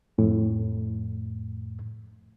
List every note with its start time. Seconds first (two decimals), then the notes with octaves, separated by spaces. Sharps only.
0.18 F2 A2